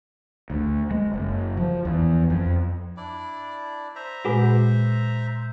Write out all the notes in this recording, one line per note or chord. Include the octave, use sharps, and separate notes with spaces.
D2
G#3
F#1
F3
E2
F2
D4 E4 D5
C5 E5 A#5
A#2 G#3 F#4 G#4 B4